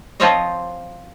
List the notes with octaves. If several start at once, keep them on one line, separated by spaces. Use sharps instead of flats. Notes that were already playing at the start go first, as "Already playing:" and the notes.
F3 C4 F4 C5 C#5 D#5